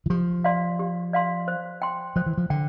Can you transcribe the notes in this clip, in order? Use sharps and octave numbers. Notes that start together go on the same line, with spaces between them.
E3
F3 G4
D5 F5 C6
G4
D5 F5 C6
C5
G5 C6
F3 C5
E3
F3
D3 G5